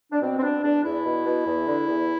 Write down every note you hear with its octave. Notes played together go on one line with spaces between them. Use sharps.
D4
B2 C4
C4
B2 D4
E2 D4
E2 E4
B2
B2
E2
D3
E2